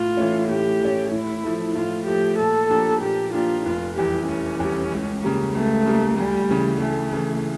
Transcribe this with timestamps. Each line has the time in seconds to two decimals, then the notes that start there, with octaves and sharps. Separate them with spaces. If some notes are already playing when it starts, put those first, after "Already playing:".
Already playing: A2 F4
0.17 E3 A3 C#4
0.49 A2 G4
0.81 E3 A3 C#4
1.11 A2 E4
1.44 F3 A3
1.75 A2 F4
2.07 F3 A3 G4
2.38 A#2 A4
2.70 F3 A#3 D4 G4
3.01 A#2 G4
3.33 F3 A#3 D4 F4 G4
3.65 F1 F4
3.97 E2 E3 G3 G4
4.28 F1 C#4
4.60 E2 E3 G3
4.92 C#2
5.23 C#3 G3 A#3
5.55 C#2 A3
5.86 C#3 G3 A#3
6.18 D2 G3
6.49 C#3 E3
6.81 D2 A3
7.13 C#3 E3